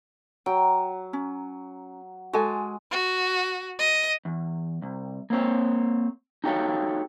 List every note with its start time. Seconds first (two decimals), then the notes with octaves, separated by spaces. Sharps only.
0.46 F#3 G5
1.13 C#4
2.33 G#3 F#4 A4 G#5
2.91 F#4
3.79 D#5
4.25 E2
4.82 C2
5.30 A#3 C4 C5 C#5
6.44 D#4 F#4 G4 A4 C#5 F5